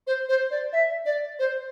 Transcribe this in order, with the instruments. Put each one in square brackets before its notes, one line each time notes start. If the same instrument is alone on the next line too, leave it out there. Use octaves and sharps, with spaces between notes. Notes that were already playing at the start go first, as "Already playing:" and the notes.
[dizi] C5
C5
D5
E5
D5
C5